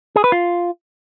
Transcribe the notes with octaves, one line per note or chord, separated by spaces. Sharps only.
G#4
B4
F4